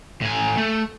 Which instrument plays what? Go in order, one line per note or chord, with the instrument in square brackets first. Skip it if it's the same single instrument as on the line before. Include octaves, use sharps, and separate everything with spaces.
[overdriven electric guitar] A2 G#5
A3